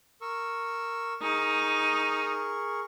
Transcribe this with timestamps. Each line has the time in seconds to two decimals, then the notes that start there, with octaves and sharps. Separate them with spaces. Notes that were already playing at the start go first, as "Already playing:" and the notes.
0.21 A#4 C#6 E6
1.22 D#4 G#4 A#4 C#6